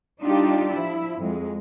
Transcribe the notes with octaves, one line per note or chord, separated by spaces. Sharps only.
G3 D4 D#4 F4 G4
F3 E4
F2 G#3